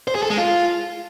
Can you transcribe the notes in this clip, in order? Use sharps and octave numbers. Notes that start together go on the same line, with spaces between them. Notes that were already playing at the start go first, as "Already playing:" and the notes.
C5
G#4
A4
G#3
F4